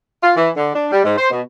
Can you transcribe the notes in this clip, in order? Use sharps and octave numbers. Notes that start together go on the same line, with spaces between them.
F4
E3
D3
D4
G3
G#2
C5
B2